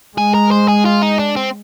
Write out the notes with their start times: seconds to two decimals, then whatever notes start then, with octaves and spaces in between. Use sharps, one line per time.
0.17 G#3 G#4
0.34 A#4
0.51 C5
0.68 G#4
0.85 F4
1.02 D#4
1.19 D4
1.36 C4